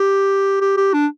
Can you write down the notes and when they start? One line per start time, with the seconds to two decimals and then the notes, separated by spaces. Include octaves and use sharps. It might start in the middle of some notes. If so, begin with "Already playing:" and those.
Already playing: G4
0.61 G4
0.77 G4
0.94 D4